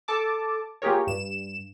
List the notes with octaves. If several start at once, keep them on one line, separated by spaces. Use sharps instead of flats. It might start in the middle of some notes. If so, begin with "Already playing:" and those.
A4 A5 D6
A#3 F4 G4 G#4 A#4 C#5
G2 E7